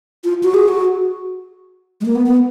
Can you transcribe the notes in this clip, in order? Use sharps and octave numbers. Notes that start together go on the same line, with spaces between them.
F4
F#4
G#4
F#4
G#3
A#3
B3
B3